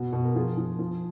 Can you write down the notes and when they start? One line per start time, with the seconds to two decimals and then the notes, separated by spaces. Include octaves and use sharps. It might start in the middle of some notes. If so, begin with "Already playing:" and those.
Already playing: B2 F#4
0.12 B2
0.24 A#4
0.35 F3 F4 G#4
0.57 F3
0.79 F3